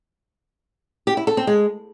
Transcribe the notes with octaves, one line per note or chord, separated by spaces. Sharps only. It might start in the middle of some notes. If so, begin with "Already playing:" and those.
G4
E4
A4
C4
G#3